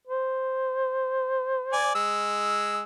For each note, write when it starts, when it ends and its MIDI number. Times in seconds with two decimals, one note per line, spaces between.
0.07 2.06 72
1.73 1.94 74
1.73 1.94 80
1.95 2.82 56
1.95 2.82 88